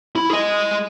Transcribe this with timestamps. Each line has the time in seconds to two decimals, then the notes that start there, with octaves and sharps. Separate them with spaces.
0.16 E4
0.30 G#4 D#5